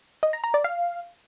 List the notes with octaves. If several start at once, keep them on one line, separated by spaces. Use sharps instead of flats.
D#5
A#5
A#5
D5
F5